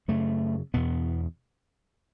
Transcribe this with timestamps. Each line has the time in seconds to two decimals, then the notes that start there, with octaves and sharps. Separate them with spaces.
0.08 F#2 C#3 A3
0.74 E2 B2 B3